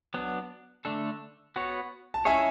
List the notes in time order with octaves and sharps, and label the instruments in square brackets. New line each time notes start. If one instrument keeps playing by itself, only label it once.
[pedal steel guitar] F#3 B3 D4
D3 A3 D4 A4
B3 F#4 C#5
[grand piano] A5
[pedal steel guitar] G#3 C#4 E4 G#4 C#5 [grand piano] E5 G#5